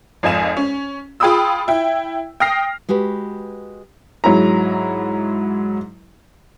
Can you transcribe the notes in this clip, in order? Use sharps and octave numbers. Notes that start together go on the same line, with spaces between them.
G#1 F2 D#5 G#5 E7
C#4
F4 G#4 G5 B5 D#6 E6
E4 G5
G5 D#6 F6 A#6 C7
G#3 F#4 G4 B4
G#2 F#3 E4 A#5